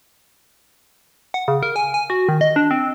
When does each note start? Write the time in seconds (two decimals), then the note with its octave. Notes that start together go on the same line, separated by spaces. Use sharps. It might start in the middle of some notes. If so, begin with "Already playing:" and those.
1.34 F#5
1.48 C#3
1.63 A#4
1.76 G#5
1.94 G#5
2.10 F#4
2.29 D#3
2.41 D#5
2.56 D4
2.71 C4